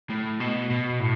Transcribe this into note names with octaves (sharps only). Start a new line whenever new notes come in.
A2
B2
B2
A2